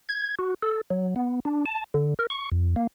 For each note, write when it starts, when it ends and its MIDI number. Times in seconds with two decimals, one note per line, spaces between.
0.09 0.35 92
0.39 0.54 66
0.63 0.81 69
0.90 1.14 54
1.16 1.40 59
1.45 1.65 62
1.66 1.84 81
1.94 2.14 50
2.19 2.27 70
2.30 2.49 85
2.52 2.75 41
2.76 2.87 58